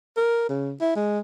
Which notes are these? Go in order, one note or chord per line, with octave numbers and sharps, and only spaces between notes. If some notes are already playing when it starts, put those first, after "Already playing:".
A#4
C#3
E4
G#3